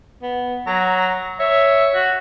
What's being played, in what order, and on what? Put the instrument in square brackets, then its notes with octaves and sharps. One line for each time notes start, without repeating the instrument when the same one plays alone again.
[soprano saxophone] B3
[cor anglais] F#3 [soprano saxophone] A#5
[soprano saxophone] C#5 [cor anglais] E5
[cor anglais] F#4